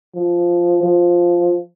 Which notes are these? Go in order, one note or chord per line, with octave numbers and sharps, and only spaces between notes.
F3
F3